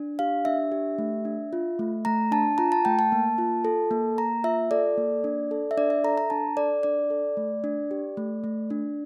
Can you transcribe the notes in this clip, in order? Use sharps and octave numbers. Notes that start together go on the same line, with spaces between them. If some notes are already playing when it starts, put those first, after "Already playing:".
Already playing: D4
G4 F5
D4 E5
G4
A3
D4
F4
A3
A3 A#5
D4 A5
F4 A#5
A5
A3 G5
A5
A#3
F4
A4
A#3
A#3 A#5
F4 E5
A4 D5
A#3
D4
A4
E5
D4 D5
E5
A4 A#5
A#5
D4 A5
A4 D5
D4 D5
A4
A3
D4
G4
A3
A3
D4